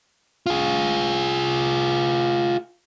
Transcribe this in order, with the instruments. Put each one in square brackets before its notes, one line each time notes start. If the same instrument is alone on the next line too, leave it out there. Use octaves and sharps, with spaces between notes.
[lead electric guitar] F4 G#4